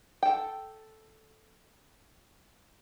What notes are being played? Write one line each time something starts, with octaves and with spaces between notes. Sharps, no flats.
A4 G5